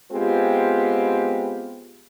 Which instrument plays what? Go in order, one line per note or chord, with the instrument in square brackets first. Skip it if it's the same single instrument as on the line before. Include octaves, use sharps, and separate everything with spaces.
[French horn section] G#3 B3 C4 F4 G4